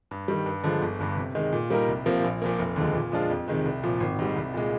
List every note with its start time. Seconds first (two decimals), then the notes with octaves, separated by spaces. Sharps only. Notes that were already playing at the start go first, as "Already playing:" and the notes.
0.11 G2
0.28 D#3 G3
0.46 G2
0.64 D3 F3 G#3
0.82 G1
1.00 G2 D3
1.17 C3
1.35 D#3 G#3
1.53 A#2
1.70 G3 A#3 D#4 A#4
1.88 C2
2.06 C3 F3 A#3
2.24 A#1
2.42 A#2 F3 A#3
2.59 F1
2.76 D#2 D3 F3 G#3
2.94 A#2
3.12 F3 G#3 D4 F4
3.30 F2
3.48 C3 D#3 G#3
3.65 C2
3.83 A#2 F3
4.00 G#1
4.19 G#2 G3
4.36 C2
4.54 A#2 G#3